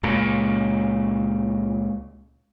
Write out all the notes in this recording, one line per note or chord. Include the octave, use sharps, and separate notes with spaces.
C#2 A#2 C#3